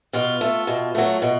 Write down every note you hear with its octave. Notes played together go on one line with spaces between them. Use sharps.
B2 F4
A3
B2
F#3 A3
B2